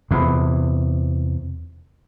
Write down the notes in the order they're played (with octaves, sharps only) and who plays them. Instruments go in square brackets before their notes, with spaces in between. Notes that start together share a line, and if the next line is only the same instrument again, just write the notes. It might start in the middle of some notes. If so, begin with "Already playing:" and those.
[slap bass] E2 C3